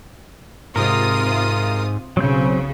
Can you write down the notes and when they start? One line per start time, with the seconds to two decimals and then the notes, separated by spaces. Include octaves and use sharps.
0.76 G#2 C3 F4 A#4 D#6
2.17 B1 C#3 F#3 C4 G6